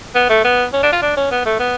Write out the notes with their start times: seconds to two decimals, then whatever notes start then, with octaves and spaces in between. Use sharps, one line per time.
0.15 B3
0.29 A3
0.45 B3
0.73 C#4
0.83 D4
0.92 F4
1.02 D4
1.17 C#4
1.32 B3
1.46 A3
1.60 B3